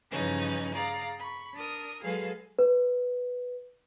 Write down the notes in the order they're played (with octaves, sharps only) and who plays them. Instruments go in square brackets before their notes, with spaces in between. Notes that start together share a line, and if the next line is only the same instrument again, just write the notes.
[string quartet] G2 C#3 E3 F3 C#4 D#4
G#4 D5 F5 A#5
B5 C#6
D4 A#4 D#6
F#3 G#3 G#4 A4 B4 F5
[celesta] B4